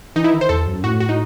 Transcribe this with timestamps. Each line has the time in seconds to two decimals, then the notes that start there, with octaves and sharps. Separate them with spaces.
0.16 E3 D#4
0.24 E4
0.33 D#3
0.41 C5
0.49 E2 A4
0.66 F#2
0.84 A2 F#4
1.00 F#4
1.09 D#4